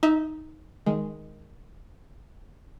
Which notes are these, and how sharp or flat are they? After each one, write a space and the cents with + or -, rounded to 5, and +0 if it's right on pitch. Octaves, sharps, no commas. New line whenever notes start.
D#4 +5 E5 -25
D#3 +0 G#3 +0